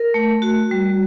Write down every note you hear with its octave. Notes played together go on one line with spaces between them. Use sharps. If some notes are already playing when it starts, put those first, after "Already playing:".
Already playing: A#4
A3
F#4
G3